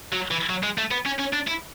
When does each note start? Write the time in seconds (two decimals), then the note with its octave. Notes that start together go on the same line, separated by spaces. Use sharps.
0.13 F#3
0.31 E3
0.50 F#3
0.63 G#3
0.78 A3
0.91 B3
1.06 C#4
1.19 C#4
1.33 D4
1.48 E4